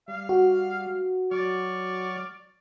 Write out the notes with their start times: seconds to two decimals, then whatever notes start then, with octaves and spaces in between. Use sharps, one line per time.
0.08 G3 F5
0.29 F#4
1.31 F#3 D5 C#6 F6